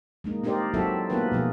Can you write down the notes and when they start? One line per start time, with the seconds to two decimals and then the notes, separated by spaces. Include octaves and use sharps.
0.24 G#3 A#3 D#4
0.44 C4 D#4 G4 A#4 C5 D5
0.74 F#3 C4 E4 F#4 A4 E5
1.10 A#3 B3 D#4 F4 A#4 B4
1.32 B2 F3 G#4